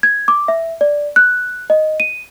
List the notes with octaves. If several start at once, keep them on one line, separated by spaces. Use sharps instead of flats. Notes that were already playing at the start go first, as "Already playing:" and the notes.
G#6
D6
E5
D5
F#6
D#5
D#7